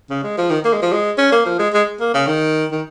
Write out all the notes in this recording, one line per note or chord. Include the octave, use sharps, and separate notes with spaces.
C#3
G#3
F3
D#3
A#3
G#3
F3
G#3
C#4
A#3
F3
G#3
G#3
A#3
C#3
D#3
D#3